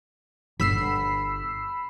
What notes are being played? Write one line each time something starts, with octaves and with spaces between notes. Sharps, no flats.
G1 B5 E6 C7